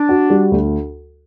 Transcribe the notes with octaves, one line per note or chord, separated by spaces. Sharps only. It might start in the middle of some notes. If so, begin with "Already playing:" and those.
Already playing: D4
F#4
G3
D2